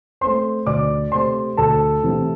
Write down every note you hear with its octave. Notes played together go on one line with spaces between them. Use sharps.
A3 C4 C5 C6
D2 D5 D6
C3 A3 C5 C6
D2 A4 A5
C3 E3 A3 C4